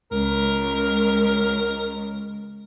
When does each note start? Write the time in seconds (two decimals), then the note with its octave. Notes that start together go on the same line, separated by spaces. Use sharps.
0.11 C#2 A#4